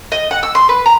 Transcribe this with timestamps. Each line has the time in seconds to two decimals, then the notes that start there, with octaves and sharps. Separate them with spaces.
0.12 D#5
0.31 F#5
0.43 E6
0.55 C6
0.69 B4
0.86 A#5